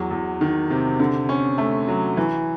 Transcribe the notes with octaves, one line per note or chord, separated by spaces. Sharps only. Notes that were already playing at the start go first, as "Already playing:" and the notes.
Already playing: E2 F#3
E2
D#3
C3
D3
C#4
A3
F#3
E3